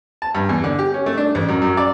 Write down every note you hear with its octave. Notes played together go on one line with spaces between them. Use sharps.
A5
G2
E2
D3
G4
C#4
A3
D4
A1
F#2
F#2
D5